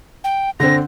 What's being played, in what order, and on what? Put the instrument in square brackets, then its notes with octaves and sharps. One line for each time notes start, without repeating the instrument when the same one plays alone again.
[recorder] G5
[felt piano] D3 C4 [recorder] A#6